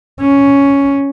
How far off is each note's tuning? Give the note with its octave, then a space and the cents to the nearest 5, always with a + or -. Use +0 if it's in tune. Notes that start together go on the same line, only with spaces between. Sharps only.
C#4 +5